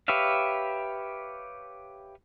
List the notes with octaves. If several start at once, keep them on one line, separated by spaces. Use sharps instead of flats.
G4 B4 C#5 E5 F5